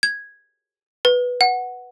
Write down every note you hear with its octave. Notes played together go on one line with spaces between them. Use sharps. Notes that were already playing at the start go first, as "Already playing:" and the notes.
G#6
B4
F#5